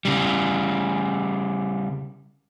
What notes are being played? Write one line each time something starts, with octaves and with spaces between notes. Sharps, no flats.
C#3 G3